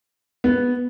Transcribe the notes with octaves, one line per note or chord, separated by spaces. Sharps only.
B3